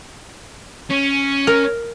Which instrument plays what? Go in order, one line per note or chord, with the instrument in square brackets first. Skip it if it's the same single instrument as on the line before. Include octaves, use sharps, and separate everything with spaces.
[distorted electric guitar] C#4
[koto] A#4